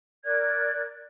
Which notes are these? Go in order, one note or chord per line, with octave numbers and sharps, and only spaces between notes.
A#4 D5 F#6 G#6